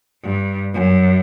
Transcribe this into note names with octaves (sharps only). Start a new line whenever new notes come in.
G2
F#2